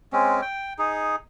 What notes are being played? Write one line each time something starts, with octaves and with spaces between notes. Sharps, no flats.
G#3 C4 C#4
G5
D#4 G#4